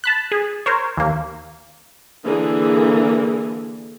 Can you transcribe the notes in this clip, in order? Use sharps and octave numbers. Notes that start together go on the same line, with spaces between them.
A5 B5 F#6
G#4
A#4 C5 C#5
D#2 A#3
D3 E3 A#3 G#4